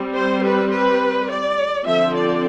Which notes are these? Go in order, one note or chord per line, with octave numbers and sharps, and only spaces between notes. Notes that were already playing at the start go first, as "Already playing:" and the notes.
Already playing: G3 C4
C5
B4
B4
D5
D3 F3 C4 E5
D5